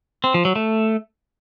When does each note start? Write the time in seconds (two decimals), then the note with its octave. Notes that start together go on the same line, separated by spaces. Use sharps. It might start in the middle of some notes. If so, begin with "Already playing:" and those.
0.24 C4
0.34 F3
0.45 F#3
0.56 A3